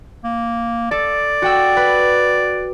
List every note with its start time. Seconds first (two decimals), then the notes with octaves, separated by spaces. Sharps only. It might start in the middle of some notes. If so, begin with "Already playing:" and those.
0.24 A#3
0.91 A4 D5
1.42 F#4 G5 E6
1.77 B4